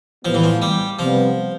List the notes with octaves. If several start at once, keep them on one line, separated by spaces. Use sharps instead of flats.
A2 F3 G3 B3
E3
F3
G3
C3 F3 G3 B3